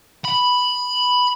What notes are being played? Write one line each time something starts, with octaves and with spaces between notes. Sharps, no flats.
B5